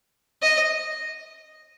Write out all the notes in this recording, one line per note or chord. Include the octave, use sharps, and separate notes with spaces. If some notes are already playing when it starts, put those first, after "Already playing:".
D#5